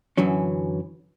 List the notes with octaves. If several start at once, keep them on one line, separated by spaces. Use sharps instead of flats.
F#2 D3 E3 F#3 C#4